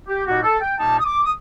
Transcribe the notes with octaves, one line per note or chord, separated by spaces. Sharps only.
G4
A#2 G3 A#3 D#4 F#4
A4
G5
A#2 G3 A#3 D#4 A5
D#6
D6
D#6